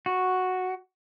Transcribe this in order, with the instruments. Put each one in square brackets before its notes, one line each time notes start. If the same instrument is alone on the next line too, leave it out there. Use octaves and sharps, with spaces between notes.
[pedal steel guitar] F#4